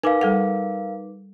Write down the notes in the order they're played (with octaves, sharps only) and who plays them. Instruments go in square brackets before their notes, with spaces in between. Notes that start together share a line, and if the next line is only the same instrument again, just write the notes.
[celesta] D#4 B4 D6 [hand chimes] A#4 F5 [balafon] G#5
[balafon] G3 A4 F#5